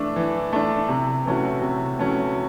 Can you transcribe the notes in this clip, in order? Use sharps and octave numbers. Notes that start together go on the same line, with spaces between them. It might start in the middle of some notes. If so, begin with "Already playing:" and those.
Already playing: E3 A3 D4
E3
A3 D4
C3
E3 A3 C#4 F#4
C3
E3 A3 C#4 F#4